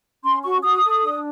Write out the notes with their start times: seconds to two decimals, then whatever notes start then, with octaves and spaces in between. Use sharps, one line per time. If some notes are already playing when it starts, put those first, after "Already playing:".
0.24 C#4 C6
0.43 F#4 C#6
0.63 F#4 D#6
0.83 A4
1.03 D4